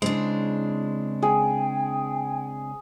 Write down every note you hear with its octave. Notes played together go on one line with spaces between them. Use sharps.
C#3 G#3 C4 D4 E4
G#4 G5